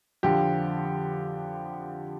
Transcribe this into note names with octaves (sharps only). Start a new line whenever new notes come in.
F2 D3 F3 G4